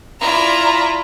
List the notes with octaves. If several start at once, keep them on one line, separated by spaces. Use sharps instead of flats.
E4 F4 D5 A#5